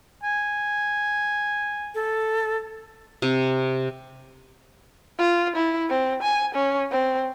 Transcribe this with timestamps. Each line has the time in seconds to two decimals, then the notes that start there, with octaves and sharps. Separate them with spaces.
0.23 G#5
1.95 A4
3.22 C3
5.19 F4
5.56 E4
5.90 C4
6.23 G#5
6.55 C#4
6.92 C4